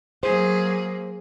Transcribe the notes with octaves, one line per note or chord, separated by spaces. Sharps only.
F#3 A#3 G#4 C5